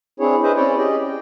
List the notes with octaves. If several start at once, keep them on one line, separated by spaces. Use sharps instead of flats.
C4 D4 E4 G#4 C#5
G#4 B4 C5 D#5 E5
C4 C#4 E4 C#5 D5 G5
C#4 G4 G#4 D5 D#5
G5